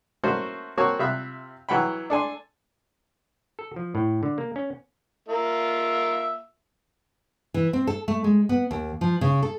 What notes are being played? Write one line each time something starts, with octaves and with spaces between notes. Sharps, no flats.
A3 A#3 C#4 F#4 A4 C5
A#3 C4 F#4 A#4 C#5 A5
C3 F4 E5 B5 F#6
E3 F#3 F#5 G5 B5
D4 A4 G#5 C6
A4
F3
A2
D3
A#3
C#4
A#3 F4 E5
E3
C4
A4
A3
G#3
B3
D#2
F3
C#3
A4